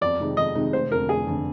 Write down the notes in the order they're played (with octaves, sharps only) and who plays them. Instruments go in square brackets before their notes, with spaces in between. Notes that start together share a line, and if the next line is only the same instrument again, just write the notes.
[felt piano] F2 [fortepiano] D5
[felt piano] C3 D#3 G#3 D#4
[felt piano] F2 [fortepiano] D#5
[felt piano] C3 D#3 G#3 D#4
[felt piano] F1 [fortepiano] C5
[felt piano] F2 D3 [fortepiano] A#4
[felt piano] F1 [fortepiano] G#4
[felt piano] F2 D3